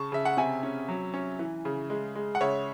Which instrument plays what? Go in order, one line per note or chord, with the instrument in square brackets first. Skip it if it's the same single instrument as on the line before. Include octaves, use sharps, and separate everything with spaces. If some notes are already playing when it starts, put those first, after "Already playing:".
Already playing: [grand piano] C#3 A5 C#6
C#3 E5
F#5
C3 E5 G#5
C#4
F#3
C#4
E3
C#3
G#3
G#3
F#5
C#3 C#5 E5